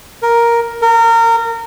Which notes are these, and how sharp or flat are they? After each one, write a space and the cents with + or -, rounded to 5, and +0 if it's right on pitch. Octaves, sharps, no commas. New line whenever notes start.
A#4 +5
A#4 -25